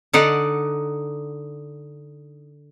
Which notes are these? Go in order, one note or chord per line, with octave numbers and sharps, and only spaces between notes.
D3 D#4 D5 F#5